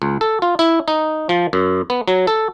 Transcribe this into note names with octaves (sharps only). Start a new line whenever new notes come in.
C#2
A4
F4
E4
D#4
F3
F#2
B3
F#3
A4